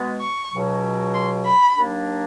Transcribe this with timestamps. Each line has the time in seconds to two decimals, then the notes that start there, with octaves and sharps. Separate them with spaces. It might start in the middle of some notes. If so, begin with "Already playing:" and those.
Already playing: B2 G#3 B3
0.20 C#6
0.52 C#2 B2 F#3
1.14 C6
1.45 B5
1.75 D#2 D#3 F#3 A#3 D4